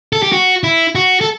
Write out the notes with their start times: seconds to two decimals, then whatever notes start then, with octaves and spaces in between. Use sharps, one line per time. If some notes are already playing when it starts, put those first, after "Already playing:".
0.13 A4
0.23 G4
0.32 F#4
0.64 E4
0.95 F#4
1.21 A4